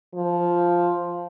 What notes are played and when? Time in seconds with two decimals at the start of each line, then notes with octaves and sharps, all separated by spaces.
0.14 F3